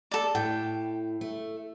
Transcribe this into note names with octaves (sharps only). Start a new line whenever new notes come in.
A4 D5
A2 G5
A3